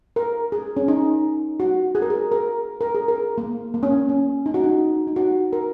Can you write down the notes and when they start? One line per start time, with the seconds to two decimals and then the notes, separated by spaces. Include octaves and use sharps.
0.16 A#4
0.52 G#4
0.77 C#4
0.88 D#4
1.60 F#4
1.95 G#4
2.02 A#4
2.10 G#4
2.32 A#4
2.81 A#4
2.95 G#4
3.08 A#4
3.38 A#3
3.74 A#3
3.83 C#4
3.92 A#3
4.09 C#4
4.46 D#4
4.54 F#4
4.64 D#4
5.07 D#4
5.16 F#4
5.53 A#4